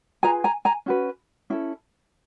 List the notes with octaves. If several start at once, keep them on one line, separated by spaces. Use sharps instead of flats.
F4 G#4 B4 G#5 A#5
G#5 A#5
G#5 A#5
C#4 F#4 B4
C#4 E4 A4